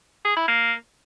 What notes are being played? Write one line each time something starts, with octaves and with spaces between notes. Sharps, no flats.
G#4
E4
A#3